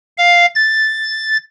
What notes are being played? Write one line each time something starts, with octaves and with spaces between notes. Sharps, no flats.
F5
A6